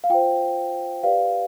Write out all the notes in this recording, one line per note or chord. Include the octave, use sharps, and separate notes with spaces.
F5
F4 C5 G5
G4 B4 D5 F5